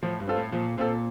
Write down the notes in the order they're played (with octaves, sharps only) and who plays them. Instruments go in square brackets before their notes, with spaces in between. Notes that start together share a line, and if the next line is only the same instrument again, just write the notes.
[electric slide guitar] A2 [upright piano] F3
[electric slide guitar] G2
[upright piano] C4 F4 A4
[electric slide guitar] A2
[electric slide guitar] A#2 [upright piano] F3
[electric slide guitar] A#2 [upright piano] C4 F4 A4